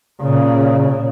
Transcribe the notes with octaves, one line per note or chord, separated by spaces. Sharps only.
A#2 C#3